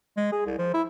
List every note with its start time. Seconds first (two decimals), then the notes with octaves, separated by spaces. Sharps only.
0.17 G#3
0.32 G#4
0.46 C2
0.59 F3
0.74 E4